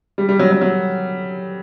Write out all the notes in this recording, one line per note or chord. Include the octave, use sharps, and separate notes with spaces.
G3
G3
F#3
F#3
F#3